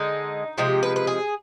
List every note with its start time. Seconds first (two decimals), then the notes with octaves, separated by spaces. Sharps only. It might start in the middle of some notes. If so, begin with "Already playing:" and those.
Already playing: D3 G#3 D#4
0.58 C3 F3 G#3 G4
0.83 B4
0.96 B4
1.07 G#4